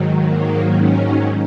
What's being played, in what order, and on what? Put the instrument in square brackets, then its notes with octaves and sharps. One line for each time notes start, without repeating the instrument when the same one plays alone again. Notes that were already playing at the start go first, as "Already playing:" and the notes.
Already playing: [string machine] G#2 D#3 F#3
A#3
C#4